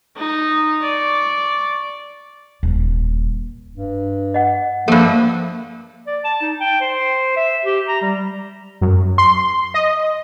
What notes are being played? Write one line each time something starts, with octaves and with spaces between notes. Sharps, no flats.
D#4
D5 C#6
D#1 D#2
G2
D#5 F#5
G2 F3 A3 A#3 A4
D5
A5
D#4
G5
C5
E5
G4
A#5
G3
F#2
C6
D#5